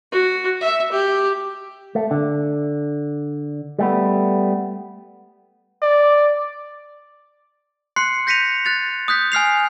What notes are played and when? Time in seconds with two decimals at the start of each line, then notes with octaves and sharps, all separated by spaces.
0.12 F#4
0.61 E5
0.92 G4
1.95 A3
2.11 D3
3.79 G3 A3 B3
5.83 D5
7.96 C6 F#6 C7 C#7
8.27 G6 A#6 B6 C#7 D#7 F7
8.65 F#6 A6 F7
9.08 D#6 F#6 G6 B6
9.32 G#5 F6 C7 F7